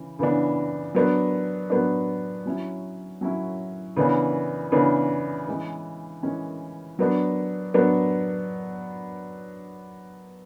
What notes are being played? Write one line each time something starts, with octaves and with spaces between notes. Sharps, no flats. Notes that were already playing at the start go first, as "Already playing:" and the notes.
Already playing: C#3 E3
C#3 E3 B3 D4
F#3 B3 D4
F#3 B3 D4
F#3 C#4 E4
F#3 C#4 E4
C#3 E3 B3 D4
C#3 E3 B3 D4
E3 G#3 C#4
E3 G#3 C#4
F#3 B3 D4
F#3 B3 D4